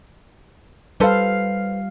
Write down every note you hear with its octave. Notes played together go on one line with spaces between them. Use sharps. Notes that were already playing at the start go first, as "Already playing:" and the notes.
G3 A4 B4 C5 F5